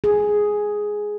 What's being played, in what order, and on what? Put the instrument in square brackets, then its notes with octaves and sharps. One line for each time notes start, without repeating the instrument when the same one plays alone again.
[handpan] G#4